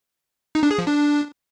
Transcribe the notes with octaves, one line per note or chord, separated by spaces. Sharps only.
D#4
D4
G#4
F3
D4